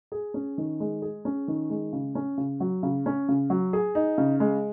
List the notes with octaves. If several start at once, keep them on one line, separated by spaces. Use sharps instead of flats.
G#4
C#4
D#3
G#3
G#4
C#4
D#3
G#3
C#3
C#4
C#3
F#3
C#3
C#4
C#3
F#3
G#4
D#4
C#3
G#3